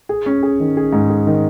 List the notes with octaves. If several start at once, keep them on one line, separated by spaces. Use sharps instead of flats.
G#4
C#4
G#4
D#3
G#4
G#2
G#4
D#3